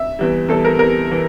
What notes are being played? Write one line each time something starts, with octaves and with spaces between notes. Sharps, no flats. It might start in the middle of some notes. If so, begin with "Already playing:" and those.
Already playing: E5
E2 E3 G3
E2 E3 G3 A4
A#4
E2 E3 G3 A#4
E3